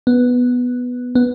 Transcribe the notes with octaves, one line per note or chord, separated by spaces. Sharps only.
B3
B3